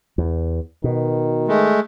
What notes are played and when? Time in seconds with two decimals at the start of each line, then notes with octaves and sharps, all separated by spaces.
0.18 E2
0.84 B2 D#3
1.48 G#3 A3